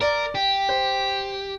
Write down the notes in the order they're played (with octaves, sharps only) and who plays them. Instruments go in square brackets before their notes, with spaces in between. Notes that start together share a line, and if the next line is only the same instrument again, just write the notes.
[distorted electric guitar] A#4 [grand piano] D5
[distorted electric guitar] G4
[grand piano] C5